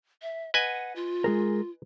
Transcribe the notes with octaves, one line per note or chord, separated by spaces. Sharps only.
E5
B4 D#5 F#5 G#5
F4
G#3 G#4 A#4